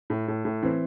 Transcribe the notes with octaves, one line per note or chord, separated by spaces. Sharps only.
A2
A2
A2
E3 C4